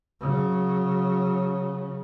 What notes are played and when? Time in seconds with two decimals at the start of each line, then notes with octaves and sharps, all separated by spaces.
0.20 C#3 F#3